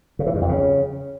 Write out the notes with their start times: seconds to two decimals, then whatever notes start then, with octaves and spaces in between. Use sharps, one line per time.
0.19 C#3
0.27 E3
0.34 G2
0.42 F2
0.49 C#3